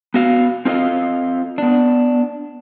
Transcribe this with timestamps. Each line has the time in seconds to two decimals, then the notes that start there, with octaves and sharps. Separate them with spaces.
0.14 B3 F#4 F5
0.65 C4 F4 A4 C5 D#5 F5
1.58 B3 D4